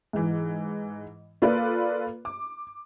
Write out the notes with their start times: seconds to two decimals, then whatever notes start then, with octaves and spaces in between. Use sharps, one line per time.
0.13 G#2 E3
1.42 A#3 F4 A4 B4 D5
2.25 D6